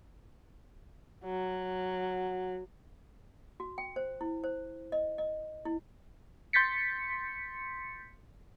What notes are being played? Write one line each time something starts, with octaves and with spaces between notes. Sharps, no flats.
F#3
F#4
G5
C5
E4
C5
D#5
D#5
E4
C6 G6 A6 B6 C#7